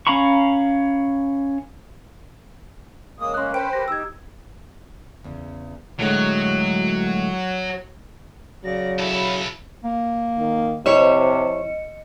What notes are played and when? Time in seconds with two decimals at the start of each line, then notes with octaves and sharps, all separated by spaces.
0.07 C#4 F5 A#5 B5 C#6
3.19 C#3 G#3 A#3 D#6
3.34 C#4 A#4 C6 F#6
3.54 B4 C5 G5 D7
3.73 G4 A#4 A#6
3.88 D#4 G4 E6 G#6
5.24 E2 C#3
5.99 A2 D3 F#3 G#3
8.64 C#3 F#3 D5 A#6
8.99 B1 E4 A4 B5
9.84 A#3
10.38 D#3
10.86 C3 F3 C4 E4 C#5 D#5 C#7